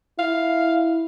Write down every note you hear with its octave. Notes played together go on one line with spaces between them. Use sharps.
E4 F5